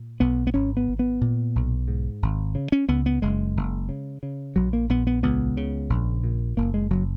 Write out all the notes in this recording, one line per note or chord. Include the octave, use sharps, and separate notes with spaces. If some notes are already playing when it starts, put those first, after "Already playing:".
Already playing: A#2
B1 B3
B3
G#1 C#4
B3
G#1
B3
A#2
B1
G#2
G#1
C#3
C#4
C#2 B3
B3
F#1 G#3
F#1
C#3
C#3
A#1 F#3
A#3
A#1 B3
B3
C#2 B3
C#3
A#1
A#2
F#1 A#3
G#3
F#1 F#3